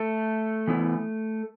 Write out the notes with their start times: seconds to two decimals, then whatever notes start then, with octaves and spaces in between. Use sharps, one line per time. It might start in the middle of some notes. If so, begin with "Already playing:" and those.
Already playing: A3 A4
0.67 E3 B3 E4